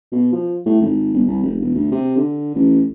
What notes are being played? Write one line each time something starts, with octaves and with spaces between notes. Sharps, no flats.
B2
F3
A2
G#1
G1
C2
F1
E1
D2
C3
D3
A1